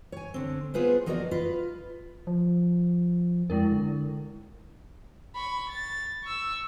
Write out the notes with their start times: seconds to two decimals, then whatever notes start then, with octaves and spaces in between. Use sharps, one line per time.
0.12 C#5 G#5
0.34 D3 C4
0.74 B3 F4 G#4 B4 C5
1.06 F3 A#3 F#4 A#4 D5 D#5
1.31 F4 B4
2.27 F3
3.50 F2 G#3 E4 A#4
3.72 D3
5.35 B5 C#6
5.69 A6
6.24 C#6 E6